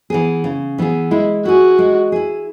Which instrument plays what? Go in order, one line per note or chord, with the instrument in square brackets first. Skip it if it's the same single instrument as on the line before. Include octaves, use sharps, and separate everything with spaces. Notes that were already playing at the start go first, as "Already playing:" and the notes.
[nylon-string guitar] E3 B3 G#4
C#3
E3 B3 G#4
[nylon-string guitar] G#3 [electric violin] E4
[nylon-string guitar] E4 G#4 [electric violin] F#4
[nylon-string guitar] G#3
E4 G#4